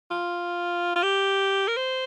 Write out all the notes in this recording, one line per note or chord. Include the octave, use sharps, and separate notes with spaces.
F4
F4
G4
A#4
C5